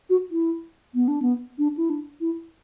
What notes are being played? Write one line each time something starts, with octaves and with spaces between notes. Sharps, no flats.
F#4
E4
B3
D4
B3
D4
E4
D4
E4